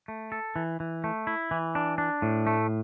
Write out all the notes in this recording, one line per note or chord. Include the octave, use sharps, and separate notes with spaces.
A3
A4
E3
E3
A3
E4
E3
D4
D4
A2
A3